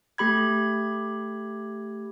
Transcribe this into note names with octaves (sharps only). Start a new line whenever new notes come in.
A3 G4 B5 G#6